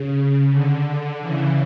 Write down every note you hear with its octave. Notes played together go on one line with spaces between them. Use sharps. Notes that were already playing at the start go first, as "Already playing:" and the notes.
Already playing: C#3
D3
C#3 E3